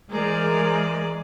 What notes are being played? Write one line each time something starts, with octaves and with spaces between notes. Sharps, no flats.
E3 G#3 G#4 A#4 C5 D5 A#5